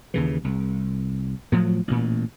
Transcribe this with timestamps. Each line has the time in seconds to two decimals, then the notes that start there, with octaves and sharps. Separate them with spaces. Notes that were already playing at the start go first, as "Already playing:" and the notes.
0.14 D#2 C#3 E3
0.44 C2
1.52 A2 F3 F#3
1.88 A1 A#2